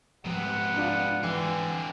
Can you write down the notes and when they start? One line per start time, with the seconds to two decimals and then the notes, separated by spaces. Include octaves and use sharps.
0.25 G#2 C3 F3 G3 B3 F#5
0.76 D4 F4
1.23 D3 E3 C4